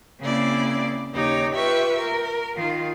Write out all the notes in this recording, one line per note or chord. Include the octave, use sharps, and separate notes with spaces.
C#3 A#3 C4 E4 D5 D6
D#2 C#3 D#4 G4 C#5 D6
F4 G4 B4 E5 G5 C#6
A#4
D#3 F4